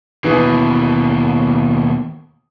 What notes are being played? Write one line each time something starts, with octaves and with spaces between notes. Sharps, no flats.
D#2 B2 E3 G#4